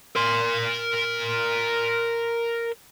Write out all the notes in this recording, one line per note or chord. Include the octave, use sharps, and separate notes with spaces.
A#4 C6